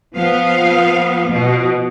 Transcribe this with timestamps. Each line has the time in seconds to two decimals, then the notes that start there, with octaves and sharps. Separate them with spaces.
0.15 F3 B3 F5
1.29 B2 F3